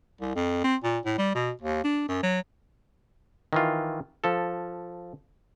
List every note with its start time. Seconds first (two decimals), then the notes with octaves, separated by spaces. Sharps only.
0.21 C2
0.36 F2
0.64 C4
0.84 A#2
1.05 A2
1.18 G3
1.35 B2
1.62 D#2
1.84 D4
2.08 F#2
2.23 F#3
3.53 D#3 E3 F4
4.24 F3 A4